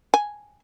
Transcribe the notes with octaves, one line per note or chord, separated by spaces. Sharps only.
G#5